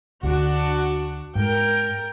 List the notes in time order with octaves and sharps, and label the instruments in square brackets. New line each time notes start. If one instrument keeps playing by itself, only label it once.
[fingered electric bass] D2 D3 [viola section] D4 F#4
[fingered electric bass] G#2 [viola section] A#4 G5